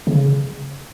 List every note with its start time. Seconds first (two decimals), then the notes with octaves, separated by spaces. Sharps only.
0.07 C#3